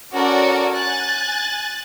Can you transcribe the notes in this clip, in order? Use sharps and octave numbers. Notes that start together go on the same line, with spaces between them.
C#4 F#4 A4 A#4 D5
G#5 F#6 A6